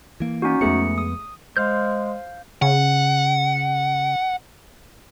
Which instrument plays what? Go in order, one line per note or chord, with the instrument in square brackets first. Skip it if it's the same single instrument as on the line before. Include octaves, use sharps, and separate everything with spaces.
[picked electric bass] E3 A#3
[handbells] C#4 D#4 F#4
[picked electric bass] F2 G#3 B3 [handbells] A3 G#4 C#7
[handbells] D#6
[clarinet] G#3 [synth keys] C5 [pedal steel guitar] F5 F6 G6
[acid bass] C#3 [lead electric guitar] F#5